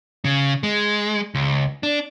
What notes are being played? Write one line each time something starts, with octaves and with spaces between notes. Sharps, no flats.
C#3
G#3
C#2
D4